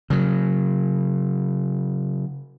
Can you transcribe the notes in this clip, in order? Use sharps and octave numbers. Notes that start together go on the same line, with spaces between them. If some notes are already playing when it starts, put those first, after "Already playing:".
C#3 F#3